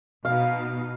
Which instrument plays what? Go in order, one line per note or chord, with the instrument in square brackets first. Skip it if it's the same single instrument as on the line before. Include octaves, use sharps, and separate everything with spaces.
[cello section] B2 D#4 [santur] F5